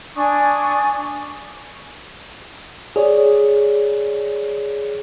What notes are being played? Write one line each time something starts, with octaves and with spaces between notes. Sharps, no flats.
D4 G#5 C#6 D#6
G#4 C#5 D5